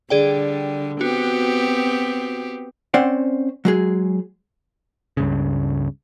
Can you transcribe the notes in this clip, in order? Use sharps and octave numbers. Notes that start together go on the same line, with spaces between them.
D3 G3 G#4 D5 G5
B3 C4 F#4 G4
C4 C#4 C5 D5 F#5
F#3 G#3 G#4
C#2 G2 C#3